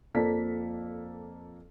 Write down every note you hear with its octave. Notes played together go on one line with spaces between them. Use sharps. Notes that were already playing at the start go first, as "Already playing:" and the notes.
F2 F3 A#3 A4 D5 B6